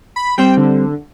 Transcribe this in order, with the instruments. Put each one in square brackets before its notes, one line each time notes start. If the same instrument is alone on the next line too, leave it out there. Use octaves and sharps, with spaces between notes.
[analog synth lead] B5
[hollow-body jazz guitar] G3 C4 C5 [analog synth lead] G5
[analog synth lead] D3